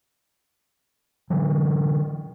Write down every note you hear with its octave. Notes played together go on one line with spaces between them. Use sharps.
D3 E3 F#3